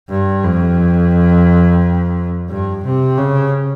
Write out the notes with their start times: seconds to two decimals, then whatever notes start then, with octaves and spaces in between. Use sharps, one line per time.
0.09 G2
0.43 F2
2.49 G2
2.84 C3
3.18 C#3